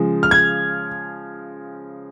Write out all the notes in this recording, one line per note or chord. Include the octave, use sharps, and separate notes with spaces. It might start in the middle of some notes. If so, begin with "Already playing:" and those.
Already playing: C#3 F3 G#3
F6
G#6